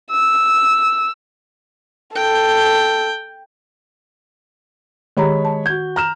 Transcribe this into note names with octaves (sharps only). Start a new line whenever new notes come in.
E6
A4 G5
D#3 G#3 G4 C#5 A#5 B5
A5
F#4 G6 G#6
A#5 F6 E7